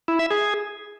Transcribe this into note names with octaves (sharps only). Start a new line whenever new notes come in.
E4
E5
G#4